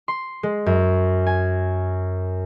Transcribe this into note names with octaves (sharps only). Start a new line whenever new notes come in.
C6
G#3
F#2
G#5